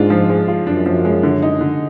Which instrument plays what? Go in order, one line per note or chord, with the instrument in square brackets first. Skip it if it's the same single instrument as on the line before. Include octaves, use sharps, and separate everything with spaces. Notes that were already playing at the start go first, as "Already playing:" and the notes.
Already playing: [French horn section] G#2 [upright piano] G#3 D4 F4
[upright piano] F3
G#3
F4
[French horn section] F#2 [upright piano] D4
[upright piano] F3
G#3
D3
D#4
D3